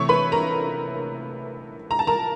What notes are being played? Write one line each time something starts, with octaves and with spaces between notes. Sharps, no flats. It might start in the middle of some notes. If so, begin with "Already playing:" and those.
Already playing: C3 E3 A3 C#5 C#6
B4 B5
A#4 A#5
A#5
A5
A#4 A#5